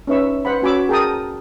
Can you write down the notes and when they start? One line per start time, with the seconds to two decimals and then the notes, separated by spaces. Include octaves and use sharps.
0.07 C#4 D#4 B4 E5 C#6 E6
0.45 B4 C5 F#5 B5
0.62 C#4 F#4 G#5 B5 D6 E6
0.89 G#4 A#4 G5 A5 A#5 D#6